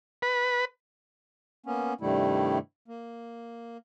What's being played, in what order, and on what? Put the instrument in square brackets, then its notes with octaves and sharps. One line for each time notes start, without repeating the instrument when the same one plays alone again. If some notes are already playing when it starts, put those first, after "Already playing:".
[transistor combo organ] B4
[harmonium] A#3 B3 C#4
G2 C3 D#3 G3 A3 E4
A#3